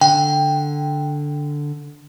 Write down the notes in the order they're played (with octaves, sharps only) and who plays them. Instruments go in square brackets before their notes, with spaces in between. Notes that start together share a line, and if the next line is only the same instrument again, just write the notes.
[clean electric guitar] D3 [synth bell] G5